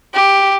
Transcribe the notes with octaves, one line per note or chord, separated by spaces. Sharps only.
G4